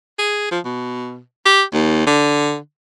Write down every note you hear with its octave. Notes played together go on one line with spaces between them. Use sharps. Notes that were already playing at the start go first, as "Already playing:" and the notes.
G#4
F3
B2
G4
D#2
D3